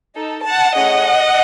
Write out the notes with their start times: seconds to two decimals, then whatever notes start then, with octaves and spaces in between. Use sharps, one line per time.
0.15 D#4 A4
0.45 F#5 A5
0.75 A3 C#4 E4 G#4 D#5 F#5